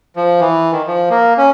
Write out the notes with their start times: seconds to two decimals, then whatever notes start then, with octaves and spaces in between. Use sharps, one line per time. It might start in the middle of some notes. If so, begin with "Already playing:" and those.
0.16 F3
0.41 E3
0.72 D#3
0.87 F3
1.10 A#3
1.38 C#4